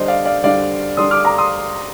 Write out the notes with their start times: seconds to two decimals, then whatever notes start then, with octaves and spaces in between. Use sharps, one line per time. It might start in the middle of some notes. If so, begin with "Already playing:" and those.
Already playing: D3 G3 D4 C5 D#5
0.08 D5 F5
0.25 D5 F5
0.43 D3 G3 D4 D5 F5
0.97 D3 G3 D4 C6 D#6
1.11 D6 F6
1.24 A#5 D6
1.38 C6 D#6